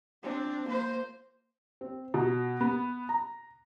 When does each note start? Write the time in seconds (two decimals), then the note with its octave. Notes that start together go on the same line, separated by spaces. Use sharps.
0.23 C4 D4
0.65 A#3 C5
1.81 C4
2.14 B2
2.61 B3
3.09 A#5